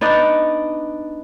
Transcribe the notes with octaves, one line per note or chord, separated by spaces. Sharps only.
B3 D4 D#4 D5